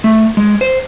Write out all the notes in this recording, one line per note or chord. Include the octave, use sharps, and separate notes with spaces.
A3
G#3
C5